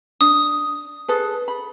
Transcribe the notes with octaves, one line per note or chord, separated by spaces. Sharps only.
D4 D#6
G#4 A4 B4
B5